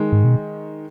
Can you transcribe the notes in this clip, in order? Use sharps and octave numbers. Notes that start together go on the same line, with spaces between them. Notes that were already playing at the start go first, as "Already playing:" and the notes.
Already playing: D#3 G#3
G#2
B2